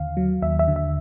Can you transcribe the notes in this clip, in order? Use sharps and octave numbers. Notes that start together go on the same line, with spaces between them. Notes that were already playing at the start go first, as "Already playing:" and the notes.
Already playing: D#2 D3 F5
F#3
D#2 E5
E5
D3
E5